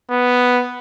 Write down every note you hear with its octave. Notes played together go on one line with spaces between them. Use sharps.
B3